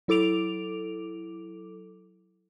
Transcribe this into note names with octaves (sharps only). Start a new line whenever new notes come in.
F#3 E4 A4 D6 D7 F7